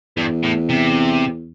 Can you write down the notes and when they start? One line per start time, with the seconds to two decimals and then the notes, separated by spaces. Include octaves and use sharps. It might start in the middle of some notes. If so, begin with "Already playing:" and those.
0.17 E2 G2
0.43 A2
0.69 C3